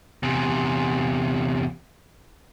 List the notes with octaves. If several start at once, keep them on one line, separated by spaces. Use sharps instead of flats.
E2 C3